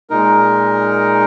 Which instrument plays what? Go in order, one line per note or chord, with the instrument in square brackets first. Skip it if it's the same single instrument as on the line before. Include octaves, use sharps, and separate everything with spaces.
[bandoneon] A#2 G#3 D#4 A#4